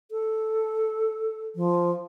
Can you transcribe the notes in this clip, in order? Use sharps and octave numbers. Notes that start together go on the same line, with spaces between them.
A4
F3